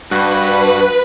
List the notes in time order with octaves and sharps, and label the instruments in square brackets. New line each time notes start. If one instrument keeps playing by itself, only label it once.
[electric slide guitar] G2 [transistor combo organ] F#4 [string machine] B4